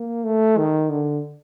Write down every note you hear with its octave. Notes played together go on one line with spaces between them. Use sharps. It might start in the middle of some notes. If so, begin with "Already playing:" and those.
Already playing: A#3
A3
D#3
D3